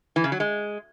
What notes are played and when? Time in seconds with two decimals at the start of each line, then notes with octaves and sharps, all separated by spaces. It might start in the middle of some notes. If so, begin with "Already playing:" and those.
0.16 E3
0.24 C#3
0.32 F#3
0.40 G#3